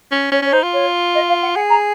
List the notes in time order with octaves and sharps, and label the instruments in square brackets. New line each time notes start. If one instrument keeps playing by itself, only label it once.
[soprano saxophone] C#4
[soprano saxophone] C#4 [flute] C#5
[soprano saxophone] C#4 [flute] C#5
[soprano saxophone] D#4 [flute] C5
[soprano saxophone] F4
[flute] C#5
D#5
F5
F#5
[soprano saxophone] G#4 [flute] F#5
[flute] A#5